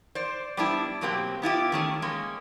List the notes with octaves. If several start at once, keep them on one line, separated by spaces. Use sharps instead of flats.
C5 D5
G3 B3 D4 E4
B2 F#3 A#3 C4 G4
B3 E4 F4 G4
D#3 A3 C#4
G#3 A#3 C#4